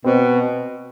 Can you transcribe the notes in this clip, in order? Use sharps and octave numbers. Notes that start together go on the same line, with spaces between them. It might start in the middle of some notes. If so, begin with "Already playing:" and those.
B2 C4